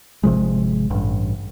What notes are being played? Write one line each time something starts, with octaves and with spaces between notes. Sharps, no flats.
G#1 C3 F3 G#3
A1 G2